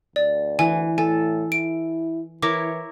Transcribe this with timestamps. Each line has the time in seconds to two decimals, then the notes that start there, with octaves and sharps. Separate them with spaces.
0.16 D2 D5
0.59 E3 G#5
0.98 A2 A4 G#5
1.52 E4 D7
2.42 E3 E4 A#4 C#5 D6